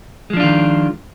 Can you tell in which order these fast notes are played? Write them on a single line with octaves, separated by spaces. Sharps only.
G#3 F3 D4 F4 D#3